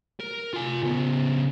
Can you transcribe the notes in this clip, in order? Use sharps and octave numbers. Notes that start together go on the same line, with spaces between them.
A#4
F4 G#5
C#3 B3